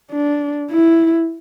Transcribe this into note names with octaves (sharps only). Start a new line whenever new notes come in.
D4
E4